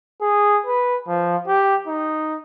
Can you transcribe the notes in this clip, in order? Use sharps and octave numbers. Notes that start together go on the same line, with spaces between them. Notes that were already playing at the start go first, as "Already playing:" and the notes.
G#4
B4
F3
G4
D#4